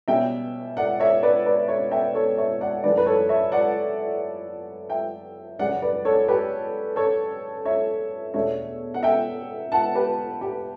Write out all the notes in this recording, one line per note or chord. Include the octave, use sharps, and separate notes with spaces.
B2 G3 C#4 E5 G5
D5 F#5
C#5 E5
B4 D5
B4 D5
C#5 E5
E5 G5
A4 C#5
C#5 E5
D5 F#5
F#2 E3 A3 D4 B4 D5
B4
A4 C#5
C#5 E5
D5 F#5
E5 G5
F#2 C#3 G3 C#4 D5 F#5
B4 D5
A4 C#5
G4 B4
A4 C#5
C#5 E5
E2 B2 A3 D4 C#5 E5
F#5
E5 G5
F#5 A5
G4 B4
G4